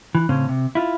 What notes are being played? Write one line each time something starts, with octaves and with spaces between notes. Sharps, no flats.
E3
A2 C#3 C4 C#4
C3
E4 F4